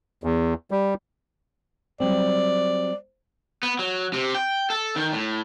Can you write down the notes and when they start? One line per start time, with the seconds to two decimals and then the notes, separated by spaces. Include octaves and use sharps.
0.24 E2
0.71 G3
2.00 F#3 G3 C4 D5
3.63 B3
3.79 F#3
4.14 C3
4.35 G5
4.70 A4
4.96 D#3
5.13 A2